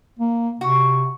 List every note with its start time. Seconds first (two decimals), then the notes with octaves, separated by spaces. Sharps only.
0.19 A#3
0.61 C3 F#4